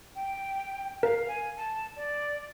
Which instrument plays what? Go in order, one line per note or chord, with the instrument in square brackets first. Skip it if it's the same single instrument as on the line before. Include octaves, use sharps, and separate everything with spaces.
[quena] G5
[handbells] A#4 [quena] F5
[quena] G#5
A5
D5